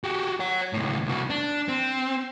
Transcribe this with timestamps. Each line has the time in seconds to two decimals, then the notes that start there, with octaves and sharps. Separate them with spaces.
0.04 F#4 G4
0.40 C#5 F#5
0.73 C#2 A2
1.06 C2 F#4
1.30 D4
1.69 C4